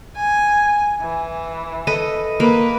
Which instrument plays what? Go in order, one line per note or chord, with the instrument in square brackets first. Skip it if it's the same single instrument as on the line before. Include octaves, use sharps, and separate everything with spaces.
[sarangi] G#5
E3
[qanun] A4 B4 D#5
[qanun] A#3 [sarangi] B4